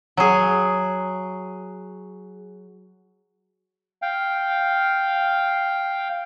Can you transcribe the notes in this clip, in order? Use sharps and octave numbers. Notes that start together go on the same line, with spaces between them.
F#3 G#4
F5 G5